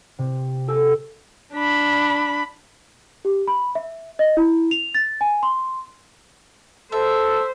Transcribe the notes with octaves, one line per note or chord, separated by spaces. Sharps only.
C3
G4 A4 G#5 E6
D4 B5
G4
B5
E5
D#5
E4
F7
A6
G#5
C6
A4 C5 E5